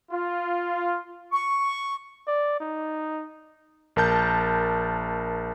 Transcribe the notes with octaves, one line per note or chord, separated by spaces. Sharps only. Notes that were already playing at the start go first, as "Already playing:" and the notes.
F4
C#6
D5
D#4
A#1 A#4 A5 G6